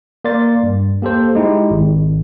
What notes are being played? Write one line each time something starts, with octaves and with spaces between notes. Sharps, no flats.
A#3 A#4 D5 C6 A6
G2
A#3 G4 A4 C5
G#3 D#4 E4 G4
G#1